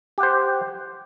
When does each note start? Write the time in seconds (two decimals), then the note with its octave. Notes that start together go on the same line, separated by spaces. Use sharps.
0.18 G4
0.20 F#5
0.23 C5